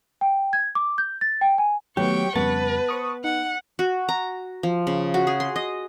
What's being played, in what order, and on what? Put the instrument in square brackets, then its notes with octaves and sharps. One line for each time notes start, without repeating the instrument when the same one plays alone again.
[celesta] G5
G#6
D6
G6
A6
G5
G#5
[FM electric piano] D#3 A3 B3 [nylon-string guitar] F#3 [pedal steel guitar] G4 [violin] G5 C#6
[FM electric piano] F2 C#3 G3 [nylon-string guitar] B3 [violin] B4 [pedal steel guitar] A5
[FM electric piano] C5 C#6 D#6
[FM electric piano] D#4 [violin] F#5
[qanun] F#4
A#5
F3
C#3
F#4
G#4
C6
D#5